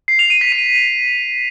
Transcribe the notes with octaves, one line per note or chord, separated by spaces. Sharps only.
C7
F7
D#7
B6
D#7